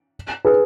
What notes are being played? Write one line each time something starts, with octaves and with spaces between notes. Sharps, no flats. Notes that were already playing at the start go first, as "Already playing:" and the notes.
G#4 B4